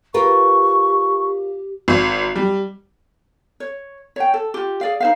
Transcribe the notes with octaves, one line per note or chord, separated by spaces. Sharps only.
F4 G4 A#4 B4 C#6
G#1
G3
C#5
C#5 G5
A4
F4 G4
G#4 D5 F5
D#4 C5 F5